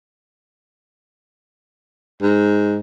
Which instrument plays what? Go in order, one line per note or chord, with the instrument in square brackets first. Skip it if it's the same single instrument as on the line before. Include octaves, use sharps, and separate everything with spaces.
[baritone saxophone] G#2